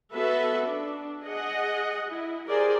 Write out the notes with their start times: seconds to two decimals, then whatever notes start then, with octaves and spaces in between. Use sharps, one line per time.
0.14 B3 F#4 A4 B4 E5
0.67 D4
1.24 G#4 D#5 F#5
2.09 E4
2.48 G4 G#4 A#4 C5 D5